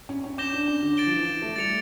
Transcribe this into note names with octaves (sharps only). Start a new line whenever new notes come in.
C#4
C#4
C#4 D6 G6 A#6 E7 G7
D4
C#4
D3
A6 D7 G7
F3
E3
A3
G3 A6 C#7 F7